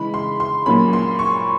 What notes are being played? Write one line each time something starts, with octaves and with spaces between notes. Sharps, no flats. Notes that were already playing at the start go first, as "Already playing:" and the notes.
Already playing: C#3 E3 G#3 B5
C6
C6
A#2 F#3 A#3 C#4 B5
C6
C#6